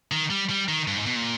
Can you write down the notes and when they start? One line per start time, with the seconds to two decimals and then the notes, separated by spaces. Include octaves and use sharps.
0.12 D#3
0.30 G3
0.50 G3
0.68 D#3
0.87 G2
0.97 G#2
1.06 B2
1.16 A#2